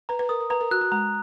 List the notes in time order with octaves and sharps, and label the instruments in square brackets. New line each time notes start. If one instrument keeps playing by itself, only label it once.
[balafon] B4 [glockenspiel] A#5
[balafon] B4
[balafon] A#4 [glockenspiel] D#6
[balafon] A#4
[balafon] B4 [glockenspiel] A#5
[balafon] A#4
[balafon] F#4 [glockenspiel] F#6
[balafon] F#4
[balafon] G#3 [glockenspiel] A#5